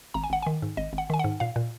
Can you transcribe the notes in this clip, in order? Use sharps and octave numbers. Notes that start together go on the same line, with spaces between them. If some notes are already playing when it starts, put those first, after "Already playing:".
G#1 A#5
G#5
G#1 F#5
D#3 G#5
G#2
G#1 D#5
G#1
F#5
D#3 G#5
G#2 F#5
A#2 F5
A#2